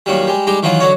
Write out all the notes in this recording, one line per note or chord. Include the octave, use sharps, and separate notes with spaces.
A#2 D#3 F#3 G3
G3 G#3
G3 G#3 D#4 G4
D#3 E3 F#3 D#4 F4
D3 F#3 D#4 C#5